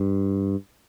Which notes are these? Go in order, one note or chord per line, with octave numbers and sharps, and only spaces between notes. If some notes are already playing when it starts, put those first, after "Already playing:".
Already playing: G2